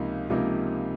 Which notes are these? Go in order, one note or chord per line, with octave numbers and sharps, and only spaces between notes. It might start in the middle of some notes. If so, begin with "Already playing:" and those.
Already playing: C#2 C3 F3 A#3 D#4
C#2 C3 F3 A#3 D#4